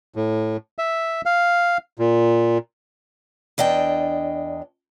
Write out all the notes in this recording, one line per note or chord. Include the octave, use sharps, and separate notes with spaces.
A2
E5
F5
A#2
E2 D4 D#5 G5